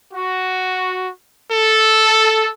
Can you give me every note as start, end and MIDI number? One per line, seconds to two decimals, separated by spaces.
0.12 1.09 66
1.51 2.48 69